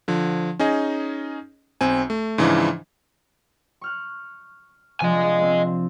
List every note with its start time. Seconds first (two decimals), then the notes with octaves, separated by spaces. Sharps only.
0.08 D3 F3
0.59 C#4 D#4 G#4 D#5
1.81 B1 C4 G#5
2.10 A3
2.38 G#2 C#3 E3 F3 D4 E4
3.81 C#6 F6 F#6
5.01 C3 F3 D4 D#5 G#5
5.42 C4